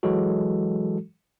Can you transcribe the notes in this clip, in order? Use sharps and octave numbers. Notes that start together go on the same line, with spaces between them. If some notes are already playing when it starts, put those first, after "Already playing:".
E3 F#3 G#3 F#4 A4